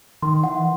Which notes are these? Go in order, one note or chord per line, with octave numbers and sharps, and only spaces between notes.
D#3 C6
E3 F#5